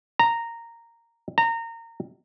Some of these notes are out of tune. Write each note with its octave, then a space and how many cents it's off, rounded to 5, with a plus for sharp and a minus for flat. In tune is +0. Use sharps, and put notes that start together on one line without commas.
A#5 -10
A#5 -25